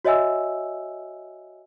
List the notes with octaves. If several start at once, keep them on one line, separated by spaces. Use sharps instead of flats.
F#4 C#5 D#5 E5 G#5 E6